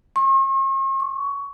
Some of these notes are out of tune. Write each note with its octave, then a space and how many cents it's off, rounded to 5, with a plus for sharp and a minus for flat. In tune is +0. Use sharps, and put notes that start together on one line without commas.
C#6 -45
C#6 +20